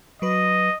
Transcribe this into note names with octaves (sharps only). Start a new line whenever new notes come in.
F#3 B4 D#5